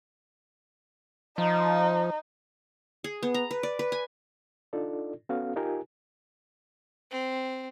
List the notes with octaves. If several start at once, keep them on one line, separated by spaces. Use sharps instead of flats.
F3 D#4
G#4
B3
A#5
B4
D5
B4
G#5
D4 D#4 F4 A4 D5
B3 C#4 F#4 A4 F5
D#4 F4 G4 A#4 G#5
C4